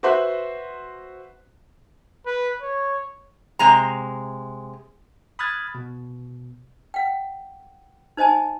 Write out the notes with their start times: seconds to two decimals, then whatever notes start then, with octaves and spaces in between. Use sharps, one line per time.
0.03 F#4 B4 C5 E5 C6 F#6
2.26 B4
2.62 C#5
3.59 C3 G#3 A#5
5.39 B5 D#6 F6 F#6 G#6 A6
5.75 B2
6.94 F#5 G5
8.17 D#4 C5 D#5 G#5 A5